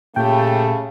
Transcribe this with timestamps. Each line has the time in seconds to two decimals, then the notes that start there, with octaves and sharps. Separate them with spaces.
0.16 A#2 C#3 A3 G4 G5